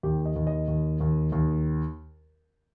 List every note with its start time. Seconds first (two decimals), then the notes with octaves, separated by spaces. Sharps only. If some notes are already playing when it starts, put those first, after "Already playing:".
0.03 D#2 G4
0.25 D#5
0.36 D#2
0.47 D#5
0.68 D#2
1.00 D#2
1.32 D#2